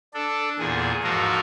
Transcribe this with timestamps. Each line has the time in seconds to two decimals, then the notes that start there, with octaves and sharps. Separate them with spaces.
0.14 D4 A4
0.59 E2 A#2 G#4
1.03 G#2 F3 F#4 A4 A#4